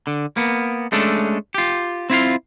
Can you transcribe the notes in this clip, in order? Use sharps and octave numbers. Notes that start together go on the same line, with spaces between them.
D3
A#3 B3
G#3 A3 C#4 D4 A4
F4 G4
C4 E4 F4 F5